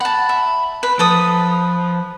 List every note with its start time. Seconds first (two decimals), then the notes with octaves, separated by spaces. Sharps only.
0.01 F#5 A5 B5
0.29 E5
0.83 B4
0.99 F3 A4 B4 D#6